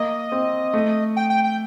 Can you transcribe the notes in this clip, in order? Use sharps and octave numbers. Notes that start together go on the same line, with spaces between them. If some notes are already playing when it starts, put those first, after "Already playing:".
Already playing: A#3 D#5
C4
A3
G5
G5
G5